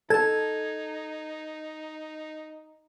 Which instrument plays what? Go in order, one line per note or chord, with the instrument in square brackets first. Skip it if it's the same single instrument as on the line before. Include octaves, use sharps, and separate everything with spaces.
[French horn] D#4 [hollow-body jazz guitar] A4 A5 [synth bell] G#6